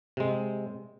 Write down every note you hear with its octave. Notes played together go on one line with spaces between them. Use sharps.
C3 G#3